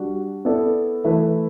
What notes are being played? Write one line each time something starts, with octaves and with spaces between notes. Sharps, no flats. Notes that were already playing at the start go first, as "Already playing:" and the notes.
Already playing: G3 D4 F#4
B3 E4 A4 D5
E3 A3 E4 B4